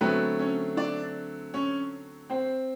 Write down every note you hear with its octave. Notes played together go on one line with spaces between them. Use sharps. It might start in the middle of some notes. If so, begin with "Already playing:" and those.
D3 F#3 A3 B3 C4 B4
C#4 C#5
D4 D5
C#4 C#5
C4 C5